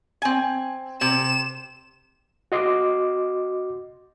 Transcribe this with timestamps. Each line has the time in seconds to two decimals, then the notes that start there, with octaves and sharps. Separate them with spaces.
0.22 C4 G#5
1.01 C3 E7
2.52 F#4 D#5 C6 D6